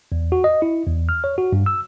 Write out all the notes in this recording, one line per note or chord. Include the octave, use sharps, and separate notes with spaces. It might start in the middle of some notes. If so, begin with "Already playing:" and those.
E2
F#4
D#5
E4
E2
F6
C#5
F#4
G2
E6